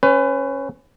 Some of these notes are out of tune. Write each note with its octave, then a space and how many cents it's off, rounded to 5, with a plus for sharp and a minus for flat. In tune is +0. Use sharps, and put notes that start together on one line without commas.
C#4 -10 B4 +30